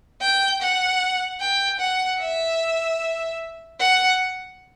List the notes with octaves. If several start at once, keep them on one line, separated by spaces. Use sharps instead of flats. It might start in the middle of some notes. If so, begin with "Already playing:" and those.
G5
F#5
G5
F#5
E5
F#5